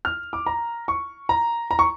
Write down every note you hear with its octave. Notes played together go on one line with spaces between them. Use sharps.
F6
D6
A#5
C#6
A#5
A#5
C#6